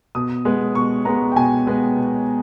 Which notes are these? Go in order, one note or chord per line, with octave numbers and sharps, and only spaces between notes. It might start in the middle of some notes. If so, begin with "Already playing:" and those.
B2 D#6
G#3 B3
B2 C#6
G#3 B3 A#5
G5
B2 G#5
G#3 B3
B2